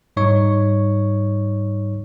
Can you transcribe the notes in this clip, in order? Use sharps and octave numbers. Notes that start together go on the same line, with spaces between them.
G#2 G3 D#4 C#5 C#6